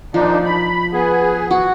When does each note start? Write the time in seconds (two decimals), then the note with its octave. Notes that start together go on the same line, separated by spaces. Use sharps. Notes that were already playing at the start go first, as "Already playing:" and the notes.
0.14 A#2 F3 D4 D#4
0.45 B5
0.93 B3 G#4
1.51 F#4